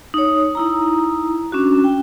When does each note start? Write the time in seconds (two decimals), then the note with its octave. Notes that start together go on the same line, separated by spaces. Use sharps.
0.14 D#4 C#5
0.55 D#4 E4 A#5
1.52 C#4 D4 F#4
1.84 G5